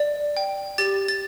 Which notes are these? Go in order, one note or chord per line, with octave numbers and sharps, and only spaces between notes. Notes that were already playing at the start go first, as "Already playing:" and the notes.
Already playing: D5
G5
G4 A6
A6